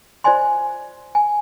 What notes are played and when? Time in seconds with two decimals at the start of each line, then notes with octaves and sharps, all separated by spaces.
0.24 F4 C5 D5 D#5 G#5 C6
1.15 G#5